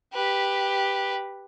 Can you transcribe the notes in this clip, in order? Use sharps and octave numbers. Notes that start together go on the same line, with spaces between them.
G4 B4